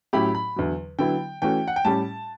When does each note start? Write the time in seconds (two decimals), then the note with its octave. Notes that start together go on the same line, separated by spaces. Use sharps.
0.13 A2 F#3 C#4 E4 G4 B5
0.35 B5
0.56 E2 D3 F#3
0.99 D3 F#3 B3 E4 G5
1.42 E3 A3 C#4 F#4 G5
1.68 F#5
1.76 G5
1.85 A2 G3 C#4 G4 A5